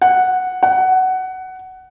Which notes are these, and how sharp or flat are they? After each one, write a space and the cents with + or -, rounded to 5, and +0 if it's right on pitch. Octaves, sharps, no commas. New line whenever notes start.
F#5 -5
F#5 +15